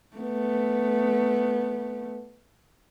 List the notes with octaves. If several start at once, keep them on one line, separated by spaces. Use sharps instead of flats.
A3 B3